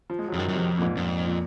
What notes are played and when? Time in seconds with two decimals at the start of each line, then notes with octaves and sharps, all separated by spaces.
0.10 F3
0.19 G#3
0.28 F#3
0.34 F2
0.38 F#2 D#3
0.49 F#2
0.53 F2 C3
0.78 A#2
0.82 G#2
0.97 F2 A#2
1.26 A#2